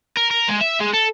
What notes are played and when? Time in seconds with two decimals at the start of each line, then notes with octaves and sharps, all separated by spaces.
0.17 A#4
0.31 A#4
0.49 G#3
0.61 E5
0.80 G#3
0.93 A4